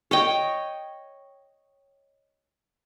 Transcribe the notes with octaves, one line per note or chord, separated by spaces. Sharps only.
C#5 D#5 G5